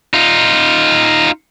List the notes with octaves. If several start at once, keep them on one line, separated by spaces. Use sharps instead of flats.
D#4 F4